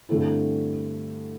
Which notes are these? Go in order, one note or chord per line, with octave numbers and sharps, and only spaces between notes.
G2 D3 A3 C4 E4